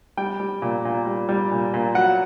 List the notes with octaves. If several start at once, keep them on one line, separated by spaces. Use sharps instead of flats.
G3 G5
G3
A#2
A#2
G3
G3
A#2
A#2
F#3 F#5